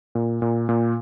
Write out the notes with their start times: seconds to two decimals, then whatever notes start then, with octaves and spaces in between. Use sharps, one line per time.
0.15 A#2
0.42 A#2
0.69 A#2